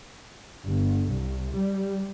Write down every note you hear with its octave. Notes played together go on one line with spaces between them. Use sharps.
G1
C2
G3